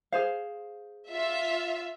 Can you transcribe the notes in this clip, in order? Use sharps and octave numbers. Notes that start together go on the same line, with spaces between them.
G#4 C5 F5
F4 E5